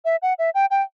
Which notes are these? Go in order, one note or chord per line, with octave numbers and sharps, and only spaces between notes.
E5
F#5
E5
G5
G5